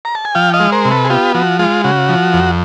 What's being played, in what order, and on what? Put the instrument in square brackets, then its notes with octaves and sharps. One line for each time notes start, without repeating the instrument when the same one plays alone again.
[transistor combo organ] A#5
A5
G#5
F3 F5 G5
D#5 F5
G#3
A#4 C5
C3
A4 B4
G#4
B3 F4 G4
F3 F#4
G#3 F4
C#3 F#4
F3
F2